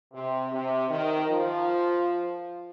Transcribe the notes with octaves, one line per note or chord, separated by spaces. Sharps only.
C3
C3
D#3
F3